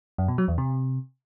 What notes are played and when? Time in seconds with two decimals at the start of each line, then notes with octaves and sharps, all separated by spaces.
0.18 F#2
0.28 B2
0.38 F#3
0.48 E2
0.58 C3